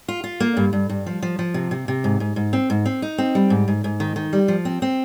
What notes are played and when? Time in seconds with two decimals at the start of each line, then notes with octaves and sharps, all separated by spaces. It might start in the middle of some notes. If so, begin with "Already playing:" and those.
0.08 F4
0.24 F4
0.40 A#3
0.57 G2
0.73 G2
0.89 G2
1.06 F3
1.22 F3
1.39 F3
1.54 C3
1.71 C3
1.88 C3
2.04 G#2
2.20 G#2
2.36 G#2
2.53 C4
2.70 G#2
2.85 C4
3.02 D#4
3.18 C4
3.35 G3
3.50 G#2
3.68 G#2
3.84 G#2
4.00 D#3
4.16 D#3
4.33 G3
4.48 F3
4.65 C4
4.82 C4